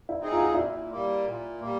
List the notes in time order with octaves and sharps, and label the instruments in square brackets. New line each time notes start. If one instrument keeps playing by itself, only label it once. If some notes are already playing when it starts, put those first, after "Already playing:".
[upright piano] E4
[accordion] C4 D#4 G#4
[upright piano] F4
F#4
F4
[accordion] A#2 [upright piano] E4
[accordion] G3 A#3
A#2
G3 A#3